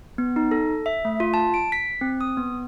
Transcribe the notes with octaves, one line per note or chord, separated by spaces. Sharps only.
B3
D#4
A4
E5
A3
F4
A5
D7
B6
C4
D#6
B3